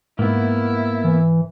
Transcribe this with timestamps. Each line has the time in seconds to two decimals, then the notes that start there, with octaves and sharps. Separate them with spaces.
0.19 G#2 A#3 B3 E4
1.04 E3